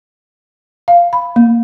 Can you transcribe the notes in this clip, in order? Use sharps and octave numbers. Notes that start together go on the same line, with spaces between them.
F5
B5
A#3